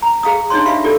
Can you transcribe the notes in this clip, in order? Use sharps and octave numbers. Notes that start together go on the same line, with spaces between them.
A#5
G#4 F5 A#5 D#6
D4 D#4 C#5 C6
G4 E5 F5 B5
F4 G4 A4 D5